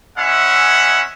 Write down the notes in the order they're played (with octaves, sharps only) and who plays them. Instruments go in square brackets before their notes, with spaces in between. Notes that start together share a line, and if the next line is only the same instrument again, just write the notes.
[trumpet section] G#3 C#4 E4 E5 F#5